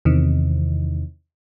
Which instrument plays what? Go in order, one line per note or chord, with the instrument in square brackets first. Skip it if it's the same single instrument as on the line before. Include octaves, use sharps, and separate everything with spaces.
[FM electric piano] E2 C3 D#3